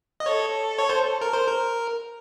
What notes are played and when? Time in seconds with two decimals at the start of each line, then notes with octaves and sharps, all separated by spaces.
0.20 D#5
0.26 A4 C#5
0.78 C#5
0.89 C5
1.21 A#4
1.33 C5
1.47 A#4